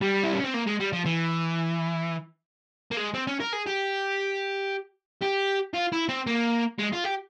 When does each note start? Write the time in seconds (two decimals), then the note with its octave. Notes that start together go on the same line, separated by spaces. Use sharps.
0.01 G3
0.23 E4
0.33 C#4
0.44 C4
0.54 A#3
0.66 G#3
0.80 G3
0.93 F3
1.06 E3
2.91 A#3
2.97 G#3
3.14 C4
3.27 C#4
3.40 A#4
3.53 G#4
3.67 G4
5.22 G4
5.74 F4
5.92 E4
6.09 C4
6.27 A#3
6.78 G#3
6.92 F4
7.04 G4